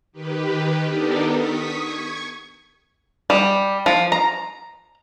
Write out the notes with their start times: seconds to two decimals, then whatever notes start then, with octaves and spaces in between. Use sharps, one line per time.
0.12 D#3 G4 B4
0.87 B3 D4 D#4 G4 A4 A#4
1.32 C#6 D#6 B6
1.78 C#6 G#6
3.30 G3
3.86 F3
4.12 A#5